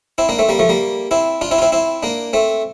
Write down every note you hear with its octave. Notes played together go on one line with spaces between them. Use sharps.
C4 E4
A#3 D4
A3 C4
G3 A#3
F3 A3
G3 A#3
C4 E4
D4 F4
C4 E4
F4
C4 E4
C4 E4
A#3 D4
A3 C4